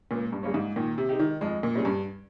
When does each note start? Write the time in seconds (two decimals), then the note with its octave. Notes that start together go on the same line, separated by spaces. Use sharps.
0.11 C#2 A#2
0.32 G2
0.43 C#3 G3 A#3 C#4
0.54 G#2
0.76 A#2 D#3
0.98 C3
1.09 G#3 D#4 G4
1.19 D#3
1.41 F2 G#3
1.63 A#2
1.74 C3 G3 C#4 G#4
1.85 G2